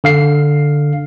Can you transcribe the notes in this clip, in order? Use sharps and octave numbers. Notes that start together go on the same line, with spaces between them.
D3 F5 C7